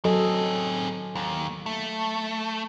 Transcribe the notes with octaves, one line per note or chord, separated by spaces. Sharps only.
F#3 C4 G#4 A4 D#5
D#2
A3